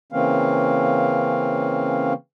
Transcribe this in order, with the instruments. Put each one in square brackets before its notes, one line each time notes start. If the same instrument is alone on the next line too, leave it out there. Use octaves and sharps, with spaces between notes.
[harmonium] C#3 E3 A#3 C4 C#4 F5